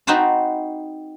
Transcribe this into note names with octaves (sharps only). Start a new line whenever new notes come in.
C4 D#4 F#4 B4 C5 A5